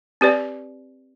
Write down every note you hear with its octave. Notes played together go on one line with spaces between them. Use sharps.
C4 G4 B4 D5